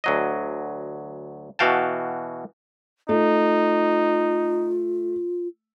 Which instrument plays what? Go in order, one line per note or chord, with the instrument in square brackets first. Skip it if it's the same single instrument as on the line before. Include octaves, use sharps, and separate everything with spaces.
[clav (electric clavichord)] D2 F#3 D#5
B2 E3 F#4 F5 G5 A5
[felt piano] A3 [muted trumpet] D#4 [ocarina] F4